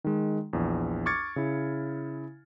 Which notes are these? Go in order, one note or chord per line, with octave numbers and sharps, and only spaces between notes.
D#3 G#3
A#1 E2
C#6 D6 F6 G#6 A6 C#7
C#3 E4